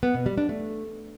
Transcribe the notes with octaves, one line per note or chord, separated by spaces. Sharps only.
B3
B2
G3
D4
A3